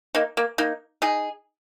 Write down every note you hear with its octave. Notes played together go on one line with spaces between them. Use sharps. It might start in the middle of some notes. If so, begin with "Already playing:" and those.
A#3 D#4
A#3
A#3 D#4
D#4 G#4